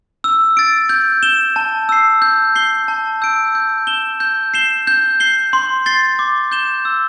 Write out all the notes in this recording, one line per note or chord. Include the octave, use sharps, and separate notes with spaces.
E6
A6 D7
G6
E7 G7
A5
E6 C7
G6
C7 G7
A5
E6 G6 D7
G6
E7 G7
G6
C7 E7 G7
G6
C7 G7
C6
A6 C7 G7
D6
G6 E7 G7
E6